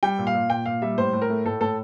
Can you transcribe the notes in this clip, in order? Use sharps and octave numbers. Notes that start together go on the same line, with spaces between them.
G3 G5
A#2
F5
A#2
A#2 G5
A#2 F5
G3 E5
A2 C5
A2
A#4
A3
A2 A4
A2 A4